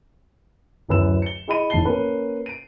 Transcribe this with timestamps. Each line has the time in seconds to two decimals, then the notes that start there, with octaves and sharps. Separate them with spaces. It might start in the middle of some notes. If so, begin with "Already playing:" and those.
0.89 D1 F#2 B4 E6 E7
1.22 C#7 G7
1.48 E4 G#4 D#5 B5 D#7
1.70 F1 A2 E3 A5 C7 G7
1.85 A#3 C#4 A#4 B4
2.46 D7 D#7